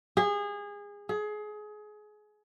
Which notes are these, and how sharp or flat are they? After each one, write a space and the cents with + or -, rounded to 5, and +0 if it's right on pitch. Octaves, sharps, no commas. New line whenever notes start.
G#4 -25
G#4 +25